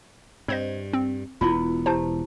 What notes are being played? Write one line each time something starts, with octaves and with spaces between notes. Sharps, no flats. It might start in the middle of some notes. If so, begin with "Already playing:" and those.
G2 C4 C5 D5 D#5
C4
E1 B3 E4 F4
E4 G4 C5 A5